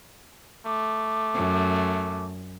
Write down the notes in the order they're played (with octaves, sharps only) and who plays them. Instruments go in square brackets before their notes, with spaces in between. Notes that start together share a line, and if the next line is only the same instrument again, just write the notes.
[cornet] A3 [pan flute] D6
[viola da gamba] F#2